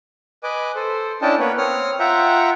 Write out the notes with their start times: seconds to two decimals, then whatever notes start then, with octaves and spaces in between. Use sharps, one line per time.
0.43 B4 D#5 G#5 D6
0.75 A4 C5
1.22 C#4 D4 E4 D#5 G5 A5
1.39 A#3 B3 B4 C#5
1.58 C4 C#5 D#6 F6
2.00 F4 E5 F#5 G5 A#5